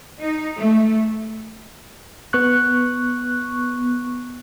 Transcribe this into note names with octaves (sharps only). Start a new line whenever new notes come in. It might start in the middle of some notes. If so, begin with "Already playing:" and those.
D#4
A3
B3 C#6 F#6